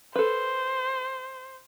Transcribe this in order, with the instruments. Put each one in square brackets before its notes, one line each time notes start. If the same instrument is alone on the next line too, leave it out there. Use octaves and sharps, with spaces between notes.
[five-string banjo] A4 B4 [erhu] C5